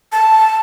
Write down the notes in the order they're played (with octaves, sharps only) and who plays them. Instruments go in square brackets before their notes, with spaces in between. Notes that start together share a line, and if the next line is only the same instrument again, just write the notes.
[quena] A5